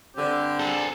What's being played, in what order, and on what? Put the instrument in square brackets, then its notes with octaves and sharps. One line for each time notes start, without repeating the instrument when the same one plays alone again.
[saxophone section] G2 D3 [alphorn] C4 [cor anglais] G4
[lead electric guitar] G#4 A4